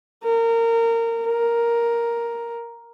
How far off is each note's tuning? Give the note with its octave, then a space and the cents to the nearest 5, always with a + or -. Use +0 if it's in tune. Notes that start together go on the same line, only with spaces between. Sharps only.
A#4 -20
A#4 +5